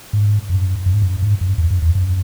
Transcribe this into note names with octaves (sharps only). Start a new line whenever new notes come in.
G#2
F#2
F#2
G#2
F#2
G#2
F#2
E2
F#2
E2
F#2